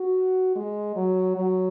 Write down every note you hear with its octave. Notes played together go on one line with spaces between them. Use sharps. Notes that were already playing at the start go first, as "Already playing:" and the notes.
Already playing: F#4
G#3
F#3
F#3